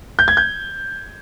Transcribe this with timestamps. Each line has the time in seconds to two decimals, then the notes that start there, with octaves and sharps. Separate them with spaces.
0.19 G6
0.28 G#6
0.37 G6